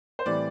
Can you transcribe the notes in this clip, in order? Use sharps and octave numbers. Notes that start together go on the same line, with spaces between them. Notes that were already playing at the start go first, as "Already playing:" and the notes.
C5
A2 E3 G3 C4 D5